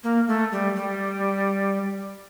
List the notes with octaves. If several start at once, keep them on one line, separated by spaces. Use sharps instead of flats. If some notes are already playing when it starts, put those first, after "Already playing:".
A#3
A3
G3
G3